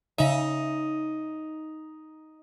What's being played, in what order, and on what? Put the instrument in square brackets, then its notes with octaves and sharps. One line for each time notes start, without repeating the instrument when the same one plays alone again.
[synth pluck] C#3 E5 [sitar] D#4